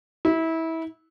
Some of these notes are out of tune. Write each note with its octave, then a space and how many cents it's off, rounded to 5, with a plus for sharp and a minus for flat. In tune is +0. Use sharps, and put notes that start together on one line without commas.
E4 -25